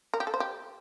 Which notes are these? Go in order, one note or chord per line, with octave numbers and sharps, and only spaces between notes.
A#4
G4
A4
C5
G4